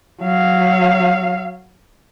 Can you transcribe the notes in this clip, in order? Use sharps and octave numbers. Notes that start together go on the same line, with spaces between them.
F#3 F5